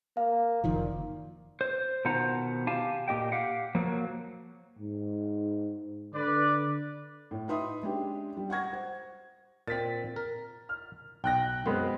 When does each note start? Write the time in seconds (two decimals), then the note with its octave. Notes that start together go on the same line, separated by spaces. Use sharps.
0.17 A#3 F5
0.64 F#1 A#2 D#3 F3
1.61 C5
2.05 B2 D#3 F4 C5 F#5 A#5
2.67 G4 F5 G#5 A5
3.08 A#2 G4 D#5 G5
3.32 G4 F5 F#5
3.75 F3 F#3 A#3
4.79 G#2
6.14 D3 B4 D5
7.31 A2
7.48 D#4 B4 E5 B5 C6 D#6
7.83 G#3 C#4 D4 G4
8.37 G3
8.50 F#5 C#6 G#6 A#6
8.73 C5 F#5
9.68 A#2 C4 A6 B6
10.16 A#4
10.69 F6
11.24 B1 G5 F#6 A#6
11.66 F#2 G#3 B3 C4